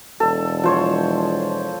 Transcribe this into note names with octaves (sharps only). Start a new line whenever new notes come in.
E1 A4
F3 C5 C#5